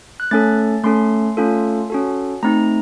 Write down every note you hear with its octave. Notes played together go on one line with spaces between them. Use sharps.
F#6
A3 C#4 A4 A6
A3 C#4 A4 C6
A3 C#4 F4 A4
C#4 F#4 A4
A3 C4 D#4 A#5